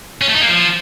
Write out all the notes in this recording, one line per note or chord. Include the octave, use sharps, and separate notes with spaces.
C#4
A3
D#4
A#3
F3